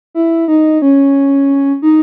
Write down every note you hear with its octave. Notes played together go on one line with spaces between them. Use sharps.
E4
D#4
C#4
D#4